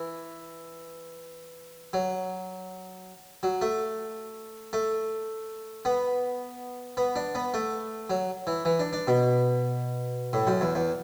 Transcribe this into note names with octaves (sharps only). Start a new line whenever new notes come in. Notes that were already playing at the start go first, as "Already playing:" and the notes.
Already playing: E3
F#3
F#3
A3
A3
B3
B3
D4
B3
A3
F#3
E3
E3
D4
D4
B2
A2
F#2
E2
E2